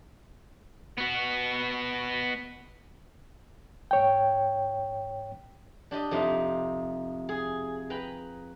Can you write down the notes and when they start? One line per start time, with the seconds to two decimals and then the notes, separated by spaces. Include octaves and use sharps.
0.98 B3 F#4
3.91 G#2 C#5 G5
5.91 D4 G4 D#5
6.11 F2 C3 D#4
7.29 G#4
7.90 B4 G5 A#5 B5